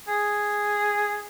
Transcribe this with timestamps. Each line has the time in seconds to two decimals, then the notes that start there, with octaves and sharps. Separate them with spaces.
0.08 G#4